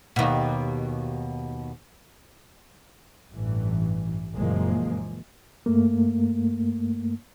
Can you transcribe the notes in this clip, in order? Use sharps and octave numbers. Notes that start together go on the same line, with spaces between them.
D#2 B2
A1 G2 E3
F#1 A#2 E3 F3 G#3 A#3
G2 A3 A#3